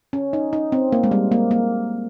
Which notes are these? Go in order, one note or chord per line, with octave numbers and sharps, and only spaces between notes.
C#4
D#4
D#4
C4
A#3
G#3
G3
A#3
A#3